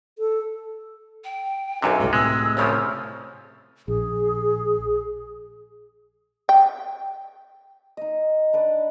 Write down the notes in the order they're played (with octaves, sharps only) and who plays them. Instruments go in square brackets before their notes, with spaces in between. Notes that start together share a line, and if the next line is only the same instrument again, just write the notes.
[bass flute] A4
[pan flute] G5
[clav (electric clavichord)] B1 F#2 C3 [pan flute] D#4
[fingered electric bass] C2 G#2 [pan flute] A4
[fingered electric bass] A2 C3 [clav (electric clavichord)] G#3 [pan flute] E6
[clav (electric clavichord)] C2 C#3 F3 [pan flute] C#5
[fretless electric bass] A#1 [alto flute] G#4
[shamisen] G5
[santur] D#4 D#5
D4 B4 D5